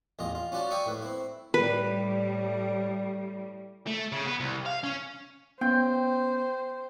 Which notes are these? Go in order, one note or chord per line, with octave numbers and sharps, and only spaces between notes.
A1 E2 F4 D#5
F4
C#4 F4 F#4 D5 A5
D5 E5 G5 G#5 C#6 D#6
A2 B4
C4 E4
A2 G3 B4
A3
C#3
B3
C2
F5
C#4
B3 C#4 C5 G5